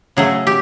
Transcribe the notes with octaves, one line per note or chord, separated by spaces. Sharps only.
C#3 F#3 A3 G#4
G4